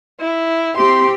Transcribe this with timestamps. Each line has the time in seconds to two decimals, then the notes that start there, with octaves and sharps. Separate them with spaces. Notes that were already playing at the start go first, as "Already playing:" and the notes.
0.20 E4
0.77 C4 G4 C6